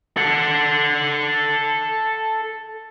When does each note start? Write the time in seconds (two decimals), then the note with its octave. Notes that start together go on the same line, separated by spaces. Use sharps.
0.17 A4 F#5